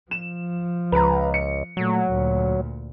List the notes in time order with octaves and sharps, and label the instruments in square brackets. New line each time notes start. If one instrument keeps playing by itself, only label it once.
[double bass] F3 [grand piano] E7
[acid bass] C#2 [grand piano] B4 A#5
[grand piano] C#7
[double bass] A#2 A3 [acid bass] F#3
[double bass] D2 A#2